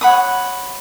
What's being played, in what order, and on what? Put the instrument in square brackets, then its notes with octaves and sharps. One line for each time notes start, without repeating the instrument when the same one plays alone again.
[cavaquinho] C#5 F#5 B5 D#6